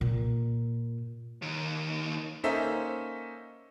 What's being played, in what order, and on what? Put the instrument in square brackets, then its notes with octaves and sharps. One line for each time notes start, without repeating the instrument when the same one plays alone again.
[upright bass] A#2
[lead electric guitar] D#2 D#3
[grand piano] A#3 C#4 D#4 A4 C5 E5